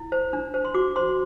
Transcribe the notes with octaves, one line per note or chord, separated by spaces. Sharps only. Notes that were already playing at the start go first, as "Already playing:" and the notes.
Already playing: E4
C5
D4
C5
C6
F#4 D6
C5 C6